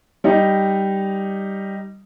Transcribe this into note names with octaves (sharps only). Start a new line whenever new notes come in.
G3 D#4